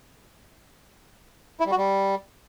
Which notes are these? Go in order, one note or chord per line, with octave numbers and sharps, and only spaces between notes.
E4
G3
F#4
G3